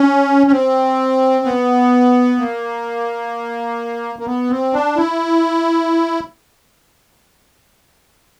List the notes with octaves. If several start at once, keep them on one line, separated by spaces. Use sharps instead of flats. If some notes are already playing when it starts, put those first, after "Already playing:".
Already playing: C#4
C#4
C4
B3
A#3
A#3
B3
C4
D4
E4